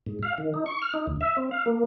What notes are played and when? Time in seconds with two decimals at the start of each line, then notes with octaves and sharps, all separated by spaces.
0.06 G#2
0.23 F5
0.38 D#3
0.54 D#4
0.66 C#6
0.82 F6
0.94 D#4
1.07 D2
1.21 E5
1.37 C4
1.51 F5
1.66 A#3